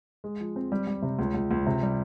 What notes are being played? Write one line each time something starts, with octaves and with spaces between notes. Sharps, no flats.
G#3
F3
C4
G3
G3
C3
C#2
C#2
C#2
C3
G3